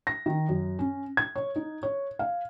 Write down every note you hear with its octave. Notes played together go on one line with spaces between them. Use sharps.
A#6
D#3
F#2
C#4
G#6
C#5
D#4
C#5
F5